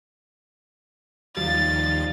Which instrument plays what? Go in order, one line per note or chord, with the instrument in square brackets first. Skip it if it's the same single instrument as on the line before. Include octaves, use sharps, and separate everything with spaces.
[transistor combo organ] D#2 F3 [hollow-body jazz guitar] G3 F4 [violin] A6